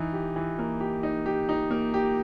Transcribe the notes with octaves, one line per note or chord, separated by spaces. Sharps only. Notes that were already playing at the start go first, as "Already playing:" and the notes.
Already playing: E3 D#4
G4
E3
A#3
G4
D#4
G4
D#4
A#3
G4